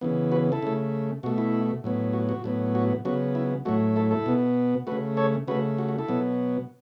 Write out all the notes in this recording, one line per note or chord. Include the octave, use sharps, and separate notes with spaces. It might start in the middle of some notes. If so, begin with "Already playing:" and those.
C#3 E3 B3
F#4 B4
E4 A4
C#3 A3
B2 A3 F#4
E4
A2 F#3 B3
F#4
F#4
A2 F#3 B3
F#4
C#3 F#3 B3 F#4
E4
A2 F#3 A3 F#4
E4 A4
E4 A4
B2 B3
C#3 A3 F#4 B4
A4 C#5
C#3 A3 F#4 B4
F#4
F#4
E4 A4
B2 F#3 B3